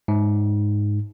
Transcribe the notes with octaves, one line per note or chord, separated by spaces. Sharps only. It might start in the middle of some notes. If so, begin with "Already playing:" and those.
G#2